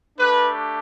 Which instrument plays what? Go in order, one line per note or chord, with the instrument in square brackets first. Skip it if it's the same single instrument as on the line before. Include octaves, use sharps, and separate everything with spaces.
[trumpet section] A3 D4 G4 B4